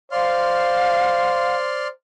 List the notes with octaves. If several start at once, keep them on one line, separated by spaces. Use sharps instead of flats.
C5 D5 F5 C6 F6